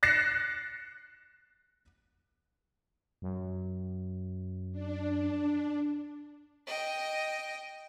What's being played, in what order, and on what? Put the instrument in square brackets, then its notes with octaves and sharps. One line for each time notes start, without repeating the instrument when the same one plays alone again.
[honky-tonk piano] F#6 A6 A#6 C7 C#7 E7
[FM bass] F#2
[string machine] D4
[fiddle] D#5 G5